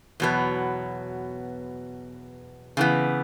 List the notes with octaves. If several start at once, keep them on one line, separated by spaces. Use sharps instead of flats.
E2 B2 F#3 B3
C#3 E3 B3